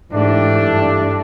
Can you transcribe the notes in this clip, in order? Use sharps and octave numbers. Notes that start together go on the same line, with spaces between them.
G#2 E3 A3 D4 G4
G2